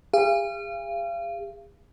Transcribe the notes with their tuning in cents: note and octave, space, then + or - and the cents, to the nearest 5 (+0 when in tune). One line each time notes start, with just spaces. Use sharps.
G#4 -40 F5 -35